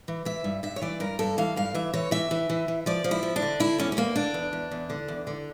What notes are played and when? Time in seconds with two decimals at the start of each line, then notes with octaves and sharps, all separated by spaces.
0.08 E3
0.25 E3 E5
0.44 G2
0.63 G2 E5
0.76 C#5
0.82 E3 D5
1.00 G2 A#4
1.19 G2 A4
1.38 E3 F5
1.56 G2 F5
1.74 E3 E5
1.93 E3 C#5
2.11 E3 E5
2.31 E3
2.50 E3
2.68 E3
2.86 F3 D5
3.04 F3
3.11 E4
3.23 F3
3.36 D4
3.42 D3
3.60 D3 E4
3.78 E2 C#4
3.92 C#4
3.97 E2 A#3
4.16 D3 D4
4.34 E2
4.53 E2
4.71 E2
4.90 D3
5.08 E2
5.27 D3